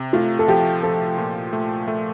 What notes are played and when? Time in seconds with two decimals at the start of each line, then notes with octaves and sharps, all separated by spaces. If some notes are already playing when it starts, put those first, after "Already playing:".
Already playing: C3
0.13 A3 F4
0.39 A4
0.48 F3 G4
0.83 F3 A4
1.18 A#2
1.53 A3
1.88 A3